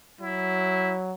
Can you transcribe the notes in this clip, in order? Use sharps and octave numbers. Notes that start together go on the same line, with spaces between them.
F#3 E4